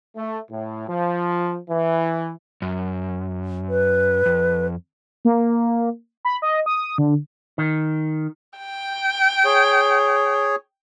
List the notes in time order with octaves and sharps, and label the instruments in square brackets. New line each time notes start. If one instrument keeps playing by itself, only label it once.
[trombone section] A3
A2
F3
E3
[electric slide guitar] F#2
[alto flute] B4
[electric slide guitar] F2
[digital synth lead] A#3
B5
D#5
D#6
D3
[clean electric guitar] D#3
[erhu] G5
[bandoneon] G#4 C#5